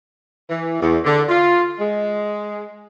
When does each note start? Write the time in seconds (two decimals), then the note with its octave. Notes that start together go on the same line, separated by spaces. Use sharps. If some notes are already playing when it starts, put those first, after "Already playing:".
0.49 E3
0.80 E2
1.04 D3
1.29 F4
1.79 G#3